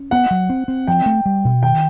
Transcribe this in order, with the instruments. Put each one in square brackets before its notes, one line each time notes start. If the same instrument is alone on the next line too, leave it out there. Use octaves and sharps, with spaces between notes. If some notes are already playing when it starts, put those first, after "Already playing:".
Already playing: [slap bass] C#4
[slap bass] B3 [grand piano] F#5
[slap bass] F#3
C4
C4
[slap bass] F3 [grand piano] G5
[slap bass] A3
G3
B2
[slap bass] D#3 [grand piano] G5